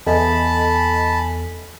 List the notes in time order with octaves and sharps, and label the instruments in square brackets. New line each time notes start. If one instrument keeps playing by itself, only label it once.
[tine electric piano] E2 [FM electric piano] A4 D#5 G#5 [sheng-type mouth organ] A5 B5